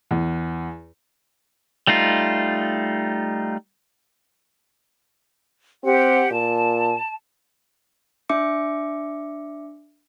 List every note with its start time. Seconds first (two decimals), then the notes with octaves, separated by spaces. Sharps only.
0.11 E2
1.87 G3 A3 D#4 F4
5.84 C4 G4 F#5
6.31 A#2 A5
8.29 D4 E5 D6 C#7